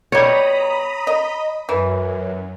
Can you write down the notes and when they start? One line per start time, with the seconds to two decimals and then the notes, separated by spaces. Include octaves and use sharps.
0.12 B2 G3 C#5 A#5 B5 D#6
1.07 D#5
1.69 F#2 E3